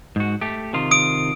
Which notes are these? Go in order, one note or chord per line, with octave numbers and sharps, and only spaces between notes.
G#2 F#4
A3 G4
C3 D#3 F4
D#6 D7